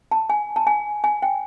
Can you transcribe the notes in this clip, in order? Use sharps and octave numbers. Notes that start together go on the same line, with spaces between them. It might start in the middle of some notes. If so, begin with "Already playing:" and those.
A5
G#5
A5
G#5
G#5
G5